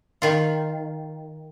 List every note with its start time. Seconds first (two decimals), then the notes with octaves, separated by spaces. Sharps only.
0.22 D#3 F4